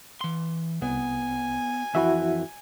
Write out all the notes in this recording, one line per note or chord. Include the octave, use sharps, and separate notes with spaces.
E3 C6
C2 B3 G#5
F2 E3 E4 F#4 E5